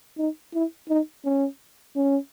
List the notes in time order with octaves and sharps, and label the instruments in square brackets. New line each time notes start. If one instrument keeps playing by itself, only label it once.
[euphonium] D#4
E4
D#4
C#4
C#4